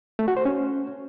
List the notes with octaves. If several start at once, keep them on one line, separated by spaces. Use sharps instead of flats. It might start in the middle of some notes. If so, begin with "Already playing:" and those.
A3
F#4
C5
C#4